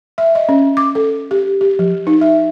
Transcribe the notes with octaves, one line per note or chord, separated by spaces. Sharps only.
E5
D#5
C#4
D6
A4
G4
G4
F3
D#4
E5